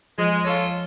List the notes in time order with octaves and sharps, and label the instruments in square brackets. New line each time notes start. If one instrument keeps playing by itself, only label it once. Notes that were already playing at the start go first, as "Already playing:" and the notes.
[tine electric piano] F3 [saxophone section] G#3
[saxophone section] C#4 F4 A4 C#5